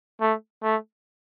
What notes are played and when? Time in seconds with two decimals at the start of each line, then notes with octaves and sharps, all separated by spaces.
0.21 A3
0.63 A3